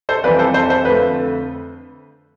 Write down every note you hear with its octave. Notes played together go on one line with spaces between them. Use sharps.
A4 C5
F2 E3 G3 B4 D5
A4 C5
A4 C5
A4 C5
F2 D3 A3 B4